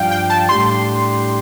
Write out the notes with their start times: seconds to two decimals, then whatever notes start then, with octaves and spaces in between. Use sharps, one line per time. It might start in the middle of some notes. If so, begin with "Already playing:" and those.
Already playing: G2 F3 D4 F5 G5
0.11 G5
0.30 A5
0.49 A2 G3 D4 G4 C6